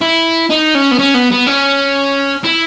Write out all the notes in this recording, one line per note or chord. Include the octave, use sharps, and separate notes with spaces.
E4
D#4
C#4
B3
C#4
B3
B3
C#4
E4